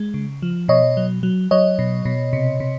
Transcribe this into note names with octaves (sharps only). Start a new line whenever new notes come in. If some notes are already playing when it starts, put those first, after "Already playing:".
Already playing: G#3
C#3
F3
B2 C#5 D#5
F#3
F#3
F#3 C#5 D#5
B2
B2
C3
C3